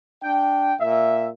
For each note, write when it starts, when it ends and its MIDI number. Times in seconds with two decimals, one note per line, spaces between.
0.22 0.74 62
0.22 0.74 79
0.80 1.27 46
0.80 1.27 76